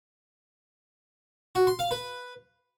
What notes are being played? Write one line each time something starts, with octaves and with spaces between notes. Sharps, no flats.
F#4
C6
F5
B4